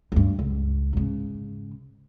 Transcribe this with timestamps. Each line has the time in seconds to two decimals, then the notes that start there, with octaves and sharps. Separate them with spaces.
0.12 D2 G2
0.39 C#2
0.93 G#2 C#3